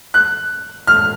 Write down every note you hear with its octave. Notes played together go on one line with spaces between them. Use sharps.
F#6
F6